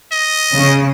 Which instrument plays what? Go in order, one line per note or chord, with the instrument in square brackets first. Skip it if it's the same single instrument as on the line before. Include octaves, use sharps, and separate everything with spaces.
[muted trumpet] D#5
[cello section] C#3